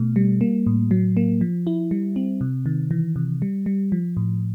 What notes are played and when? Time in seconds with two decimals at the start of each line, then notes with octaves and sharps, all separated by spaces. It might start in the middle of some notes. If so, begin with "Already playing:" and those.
Already playing: B2 A3
0.16 G3
0.41 A#3
0.67 A2
0.91 F#3
1.17 A#3
1.41 F3
1.67 E4
1.91 G3
2.16 C4
2.41 C3
2.66 D#3
2.91 E3
3.16 C3
3.42 G3
3.66 G3
3.92 F3
4.17 A2